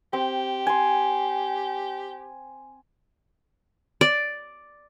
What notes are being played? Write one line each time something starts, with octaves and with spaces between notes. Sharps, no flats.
C4 G4
G#5 C6
D5